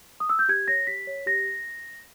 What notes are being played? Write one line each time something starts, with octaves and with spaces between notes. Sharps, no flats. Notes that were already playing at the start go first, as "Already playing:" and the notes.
D#6
E6
G6
G4 G#6
C#5 A#6
G4 B6
C#5
G4 A#6